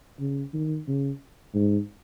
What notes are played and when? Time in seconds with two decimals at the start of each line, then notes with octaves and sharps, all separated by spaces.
0.20 C#3
0.54 D#3
0.88 C#3
1.54 G#2